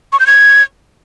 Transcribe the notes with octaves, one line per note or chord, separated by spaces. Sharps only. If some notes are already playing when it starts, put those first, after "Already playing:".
C#6
G6
G#6